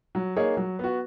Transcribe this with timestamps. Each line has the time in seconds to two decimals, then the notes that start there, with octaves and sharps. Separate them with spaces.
0.15 F#3
0.36 A#3 D#4 G#4 C#5
0.57 F#3
0.79 B3 F#4